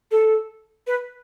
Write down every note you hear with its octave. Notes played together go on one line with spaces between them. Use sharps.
A4
B4